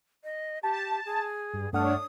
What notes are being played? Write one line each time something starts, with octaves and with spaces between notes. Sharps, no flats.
D#5
G4 A5
G#4
G2
G2 A3 D4 C#5 F#5 D#6 F6